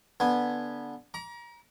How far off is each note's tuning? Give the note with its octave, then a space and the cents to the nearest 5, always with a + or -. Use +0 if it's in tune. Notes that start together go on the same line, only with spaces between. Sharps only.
D3 +0 B3 -15 G#5 +0
A#5 +30 D6 -35